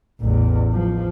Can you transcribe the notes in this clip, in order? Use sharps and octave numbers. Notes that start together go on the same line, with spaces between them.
A1 E2
F3